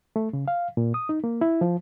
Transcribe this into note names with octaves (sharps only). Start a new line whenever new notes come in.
A3
C#3
F5
A#2
D#6
D#4
A#3
E4
F3